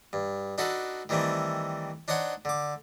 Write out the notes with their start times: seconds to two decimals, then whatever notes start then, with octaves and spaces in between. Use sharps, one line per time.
0.13 G2
0.58 D4 D#4 F#4 A4 B4 D5
1.09 D#3 E3 G3 A3 C4
2.08 D4 D#4 C5 C#5 F#5
2.45 D3 D6